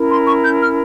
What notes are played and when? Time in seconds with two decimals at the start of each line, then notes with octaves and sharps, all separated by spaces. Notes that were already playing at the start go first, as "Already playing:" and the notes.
Already playing: C#4 E4 A#4
0.10 C6
0.27 C#6
0.43 G6
0.60 F6